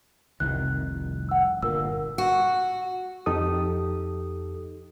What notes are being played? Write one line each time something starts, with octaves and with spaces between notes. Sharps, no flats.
F1 C2 D#3 F#6
F#5 E6
G1 A#2 A#4 E6
F#4
F2 D#4 G4 A4 D#6